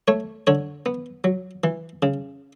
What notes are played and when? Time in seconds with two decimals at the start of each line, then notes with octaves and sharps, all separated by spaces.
0.08 A3 C#5
0.47 D3 C#5
0.86 B3
1.24 F#3
1.64 E3
2.02 C#3